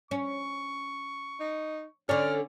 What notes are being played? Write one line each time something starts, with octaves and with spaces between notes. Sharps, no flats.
C#4 C#6
D#4
D3 C#4 C#5 D5 F6